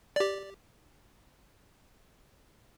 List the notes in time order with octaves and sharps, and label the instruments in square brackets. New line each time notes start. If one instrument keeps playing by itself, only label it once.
[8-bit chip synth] G4 D5